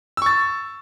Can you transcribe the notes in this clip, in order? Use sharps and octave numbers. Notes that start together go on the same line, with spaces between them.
C#6 E6 A6